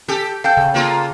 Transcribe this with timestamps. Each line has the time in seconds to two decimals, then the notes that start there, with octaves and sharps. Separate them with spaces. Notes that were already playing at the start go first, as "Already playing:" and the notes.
0.08 G4 A4
0.44 A4 F5 G5 G6
0.57 C#3
0.74 A#3 F4 A4